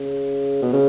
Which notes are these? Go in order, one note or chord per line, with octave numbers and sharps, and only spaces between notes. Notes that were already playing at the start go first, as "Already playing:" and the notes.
Already playing: C#3
B2
C#3